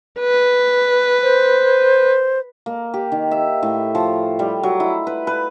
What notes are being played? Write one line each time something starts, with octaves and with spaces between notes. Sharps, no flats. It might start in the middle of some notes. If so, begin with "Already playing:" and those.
B4
C5
A#3
G4
D#3
E5
A2
F3
G3
F#3
E4
B4
B4